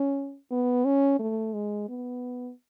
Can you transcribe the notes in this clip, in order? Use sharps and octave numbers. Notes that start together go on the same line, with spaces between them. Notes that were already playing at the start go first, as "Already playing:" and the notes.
Already playing: C#4
B3
C#4
A3
G#3
B3